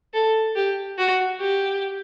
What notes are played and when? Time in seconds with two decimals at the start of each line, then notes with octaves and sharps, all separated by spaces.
0.14 A4
0.56 G4
0.98 F#4
1.40 G4